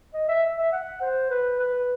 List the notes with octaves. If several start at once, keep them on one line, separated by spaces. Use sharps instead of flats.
D#5
E5
E5
F#5
C5
B4
B4